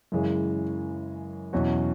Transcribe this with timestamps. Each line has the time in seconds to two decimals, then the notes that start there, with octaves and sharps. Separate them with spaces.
0.12 F#2 C#3 E3 G#3
1.53 E2 B2 F#3 C#4 F#4